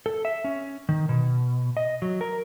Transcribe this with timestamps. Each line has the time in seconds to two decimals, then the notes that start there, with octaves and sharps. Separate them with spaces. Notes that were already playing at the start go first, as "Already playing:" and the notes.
0.06 A4
0.25 E5
0.44 C#4
0.89 D#3
1.09 B2
1.77 D#5
2.02 F#3
2.21 A#4